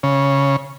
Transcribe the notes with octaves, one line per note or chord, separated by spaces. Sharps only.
C#3